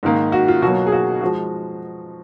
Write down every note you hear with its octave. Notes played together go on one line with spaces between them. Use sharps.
G#2 D#3 A#3
F#4
F4
B2 F#3 A#3 F#4
G#4
F#4
F3 G#3 F#4